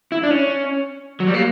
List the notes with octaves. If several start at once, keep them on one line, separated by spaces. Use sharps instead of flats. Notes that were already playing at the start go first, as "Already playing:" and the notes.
E4
D4
C#4
F#3
G3
A#3